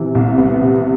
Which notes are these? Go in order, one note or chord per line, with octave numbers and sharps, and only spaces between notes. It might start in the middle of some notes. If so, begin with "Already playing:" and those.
Already playing: C3 E3
C2
B3
C3